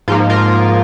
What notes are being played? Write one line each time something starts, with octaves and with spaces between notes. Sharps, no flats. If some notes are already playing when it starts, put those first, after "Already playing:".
G#2 F3 A#3 F4
F4 A#4